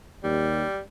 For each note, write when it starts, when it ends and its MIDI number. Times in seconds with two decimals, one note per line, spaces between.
0.24 0.64 39
0.24 0.80 55